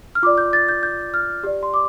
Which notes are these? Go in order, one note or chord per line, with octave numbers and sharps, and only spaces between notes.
F6
F4 D5 D6
G6
A6
G6
G6
F6
G4 D5
C6
D6